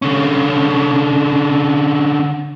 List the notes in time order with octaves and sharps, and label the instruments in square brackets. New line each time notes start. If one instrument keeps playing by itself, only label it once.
[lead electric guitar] D3 C#4